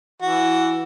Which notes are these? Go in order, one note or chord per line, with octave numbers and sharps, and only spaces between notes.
E3 F#4